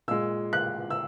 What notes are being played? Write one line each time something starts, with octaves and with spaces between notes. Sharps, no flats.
A#2 G#3 E6
F#6
E6